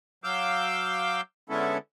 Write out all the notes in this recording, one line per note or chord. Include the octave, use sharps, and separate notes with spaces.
F#3 F5 D6 E6 G6
D3 G#3 B3 C#4 E4 A4